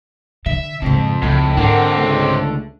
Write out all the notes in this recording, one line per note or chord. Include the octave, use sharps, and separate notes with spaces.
D3 E5
F2 G#2 C#3
C#2 A2 G#3
G#2 D3 C4 D4 A#4 F#5
C#2 A3